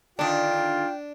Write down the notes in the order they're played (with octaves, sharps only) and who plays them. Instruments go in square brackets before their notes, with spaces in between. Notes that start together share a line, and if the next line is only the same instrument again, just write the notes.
[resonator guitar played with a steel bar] D3 D#3 [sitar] D4 [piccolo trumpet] F4 [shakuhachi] G5